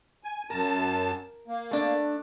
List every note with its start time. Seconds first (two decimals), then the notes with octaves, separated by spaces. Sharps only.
0.24 G#5
0.50 F#2 A#4 A5
1.48 A#3
1.71 A3 D4